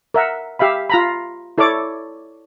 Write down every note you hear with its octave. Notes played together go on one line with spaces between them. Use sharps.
A#4 E5 F#5
G4 E5 F5 B5
F4 A#5 B5
E4 A4 C#5 D5 D6